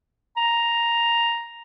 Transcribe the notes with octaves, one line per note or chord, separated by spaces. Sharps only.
A#5